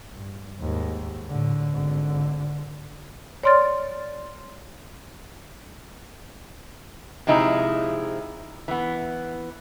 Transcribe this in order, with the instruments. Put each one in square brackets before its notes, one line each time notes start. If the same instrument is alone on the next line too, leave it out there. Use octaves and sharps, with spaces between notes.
[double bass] G2
D#2 G#2
A2 D3
G#1 D3
[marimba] C#5 D5 C6 F6 A6
[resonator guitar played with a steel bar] C3 F3 G#3 D#4 E4
E3 B3